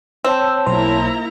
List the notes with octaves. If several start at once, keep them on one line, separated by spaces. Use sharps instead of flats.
C4 C#5 A5 E6
B1 A#3 E4 C5 A#5